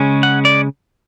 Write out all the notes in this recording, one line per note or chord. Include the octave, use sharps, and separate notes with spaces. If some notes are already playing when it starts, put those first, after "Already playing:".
Already playing: C#3 G#3 C#4
F#5
D5